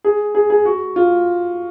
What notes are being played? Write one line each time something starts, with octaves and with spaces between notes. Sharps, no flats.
G#4
G#4
G#4
F#4
F4